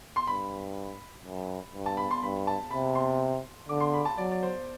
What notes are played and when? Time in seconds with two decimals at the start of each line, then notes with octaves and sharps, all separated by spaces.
0.16 C6
0.27 G2 B5
1.25 F#2
1.74 G2
1.86 A5
1.97 B5
2.11 C6
2.22 G2 B5
2.47 A5
2.71 C3 B5
2.95 C6
3.69 D3 D6
3.80 C6
3.94 B5
4.05 A5
4.18 F#3 D5
4.31 D5
4.43 C5